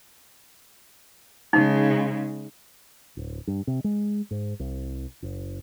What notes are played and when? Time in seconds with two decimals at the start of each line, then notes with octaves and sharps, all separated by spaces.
1.53 C#3 G#3 D#4
3.17 D1
3.47 G2
3.67 C3
3.84 G#3
4.31 G#2
4.60 C2
5.22 F#1